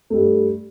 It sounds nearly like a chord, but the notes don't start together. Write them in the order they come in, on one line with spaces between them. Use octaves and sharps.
A3 G3 G2